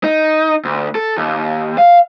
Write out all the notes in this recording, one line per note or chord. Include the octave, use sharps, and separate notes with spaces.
D#4
D2
A4
D#2
F5